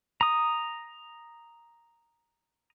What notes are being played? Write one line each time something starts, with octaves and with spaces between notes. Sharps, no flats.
A#5 D#6